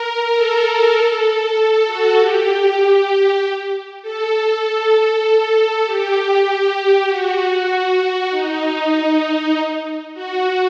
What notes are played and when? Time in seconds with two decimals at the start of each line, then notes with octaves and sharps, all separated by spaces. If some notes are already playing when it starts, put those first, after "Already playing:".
Already playing: A#4
0.35 A4
1.57 A4
1.87 F#4
2.18 G4
4.02 A4
5.85 G4
7.08 F#4
8.30 D#4
10.14 F#4